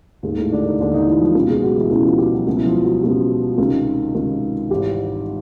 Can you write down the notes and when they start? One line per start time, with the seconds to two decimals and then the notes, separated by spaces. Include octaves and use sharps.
0.23 D#2 G#2 G#3
0.28 D#3
0.38 A2 A3
0.51 D3 D4
0.65 D#3 D#4
0.79 D#2 D3 D#3 D4
0.93 D#3 D#4
1.07 E3 E4
1.21 F3 F4
1.35 C#2 B2 G3 G4
1.49 G#3 G#4
1.63 F#3 F#4
1.77 E3 E4
1.91 C#2 B2 E3 E4
2.04 F3 F4
2.18 G3 G4
2.33 F#3 F#4
2.47 C#2 B2 F#3 F#4
2.57 E4
2.65 F3 F4
2.84 F#3 F#4
3.03 C#2 B2 G3 G4
3.58 C#2 C3 D#3
4.15 C#2 C3 D#3
4.70 G#1 G#2 E3 G3 G4